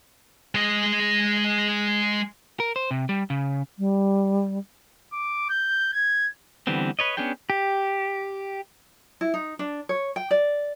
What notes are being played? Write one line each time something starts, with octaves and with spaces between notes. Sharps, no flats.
G#3 D#5
A#4
C5
C3
G3
C#3
G3
D6
G6
G#6
D3 E3 G3 B3 C4
B4 C#5 D#5
B3 C#4 D4 G#4 G5
G4
E4
D#4
D4
C#5
G5
D5